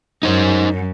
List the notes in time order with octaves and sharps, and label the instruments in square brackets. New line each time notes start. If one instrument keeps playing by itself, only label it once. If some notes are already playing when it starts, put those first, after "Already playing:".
[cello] F#2 [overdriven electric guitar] D#4 C5